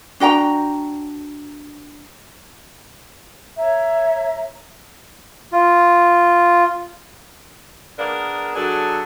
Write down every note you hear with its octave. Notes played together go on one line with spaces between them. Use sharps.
D4 F#4 G5 A#5
C#5 E5 A#5
F4
A#3 B3 D4 G#4 A#4
F#3 D4 G#4 A4